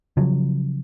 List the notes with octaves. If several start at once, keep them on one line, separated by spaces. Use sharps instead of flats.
C#3 F3 F#3